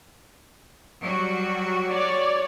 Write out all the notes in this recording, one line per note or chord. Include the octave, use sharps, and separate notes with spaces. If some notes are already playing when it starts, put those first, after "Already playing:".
F#3 G3 F#4
C#5 D5